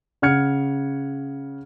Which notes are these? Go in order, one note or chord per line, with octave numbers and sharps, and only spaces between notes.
C#3 F#5 F6 G#6 C#7